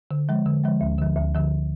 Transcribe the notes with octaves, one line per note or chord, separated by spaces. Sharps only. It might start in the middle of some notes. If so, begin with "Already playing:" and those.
D3
F3 G#3
D3
F3 G#3
D2
D3 F3
D2
D3 F3